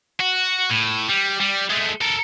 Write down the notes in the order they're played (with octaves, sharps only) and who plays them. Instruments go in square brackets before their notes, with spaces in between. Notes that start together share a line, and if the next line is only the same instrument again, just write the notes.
[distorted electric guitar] F#4
A2
G3
G3
G#3 A3
A4 A#4